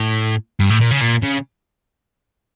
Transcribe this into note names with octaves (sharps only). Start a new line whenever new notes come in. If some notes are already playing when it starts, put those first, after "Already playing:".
Already playing: A2
G2
A2
A#2
C#3
A#2
C#3